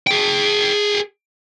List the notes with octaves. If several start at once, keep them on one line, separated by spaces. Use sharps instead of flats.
G#4 G5